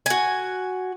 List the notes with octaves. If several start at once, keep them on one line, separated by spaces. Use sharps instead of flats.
F#4 G#5